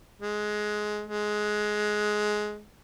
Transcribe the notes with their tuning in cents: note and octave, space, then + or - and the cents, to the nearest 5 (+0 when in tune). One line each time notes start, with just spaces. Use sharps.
G#3 +15
G#3 +15